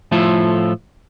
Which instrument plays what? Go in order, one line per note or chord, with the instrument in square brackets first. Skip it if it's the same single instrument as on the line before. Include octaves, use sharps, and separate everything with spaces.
[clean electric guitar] A2 F3 A3 E4 F4 A4